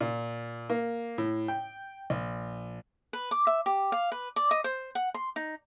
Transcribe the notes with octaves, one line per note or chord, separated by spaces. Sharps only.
A#2
A#3
A2
G5
A#1
B4
D6
E5
G4
F5
B4
D5
D#5
C5
F#5
C6
D#4